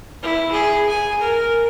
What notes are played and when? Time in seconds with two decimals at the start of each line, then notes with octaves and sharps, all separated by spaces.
0.22 E4
0.51 G#4
0.89 G#5
1.21 A#4